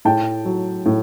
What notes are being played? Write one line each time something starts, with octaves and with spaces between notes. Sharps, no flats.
A2 G5 A5
F#3
A2